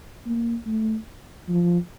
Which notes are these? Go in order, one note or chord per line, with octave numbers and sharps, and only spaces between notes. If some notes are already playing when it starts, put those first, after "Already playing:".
A#3
A3
F3